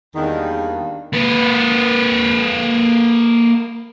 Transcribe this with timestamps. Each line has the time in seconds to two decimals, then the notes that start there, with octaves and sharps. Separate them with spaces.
0.16 E2 D#3 G3 A#3 D4
1.13 A#3 B4